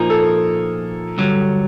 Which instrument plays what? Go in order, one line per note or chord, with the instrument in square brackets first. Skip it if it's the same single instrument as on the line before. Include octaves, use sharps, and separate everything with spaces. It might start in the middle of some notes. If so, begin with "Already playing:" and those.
Already playing: [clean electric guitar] A#2 F3 A#3 D#4 G#4 [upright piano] A#4
[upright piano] A4
[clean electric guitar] G2 D3 F#3